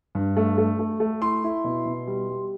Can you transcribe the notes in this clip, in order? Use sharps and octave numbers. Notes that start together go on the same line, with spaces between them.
G2
A3
A3
A3
A3
E4 C6
E4
B2
B2
G3
G3